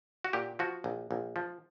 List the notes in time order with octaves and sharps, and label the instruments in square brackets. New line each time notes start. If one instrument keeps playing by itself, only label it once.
[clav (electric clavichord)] F#4
A#2 G4
F3 F#4
A#1
A#1
F3